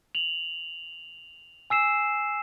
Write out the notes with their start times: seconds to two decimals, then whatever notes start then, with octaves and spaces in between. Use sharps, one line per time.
0.15 F7 F#7
1.70 G#5 E6 C7 E7